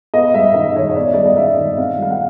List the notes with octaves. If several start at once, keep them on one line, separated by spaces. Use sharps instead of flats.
B3 D#5
G3 E5
D#3 D#5
D#3 C#5
D#5
B3 D5
G3 D5
D#5
D#3 E5
D#3
C4 F5
G3 F5
F#5